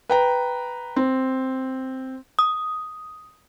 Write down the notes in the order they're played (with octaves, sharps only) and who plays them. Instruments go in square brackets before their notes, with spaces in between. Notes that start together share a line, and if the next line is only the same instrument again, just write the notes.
[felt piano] B4 G5 A#5
C4
[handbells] D#6